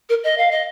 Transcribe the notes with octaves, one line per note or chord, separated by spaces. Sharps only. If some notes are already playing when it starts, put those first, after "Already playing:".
A#4
D#5
F5
D#5